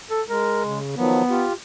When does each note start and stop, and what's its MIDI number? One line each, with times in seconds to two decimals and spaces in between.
0.10 0.22 69
0.29 0.79 56
0.29 0.62 70
0.65 0.96 49
0.96 1.22 51
0.96 1.22 53
0.96 1.22 54
0.96 1.44 59
1.30 1.53 65
1.30 1.53 67